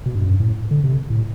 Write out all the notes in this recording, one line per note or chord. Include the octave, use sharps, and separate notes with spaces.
B2
G2
F#2
A2
D3
C3
A2